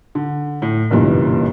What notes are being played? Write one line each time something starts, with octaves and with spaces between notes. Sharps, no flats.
D3
A2
F#1 B1 G2 A#2 E3